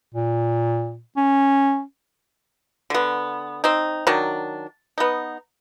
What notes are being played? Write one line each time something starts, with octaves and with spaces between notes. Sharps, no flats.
A#2
C#4
D3 B3
C4 D#4
D#3 F#3 D4
B3 D#4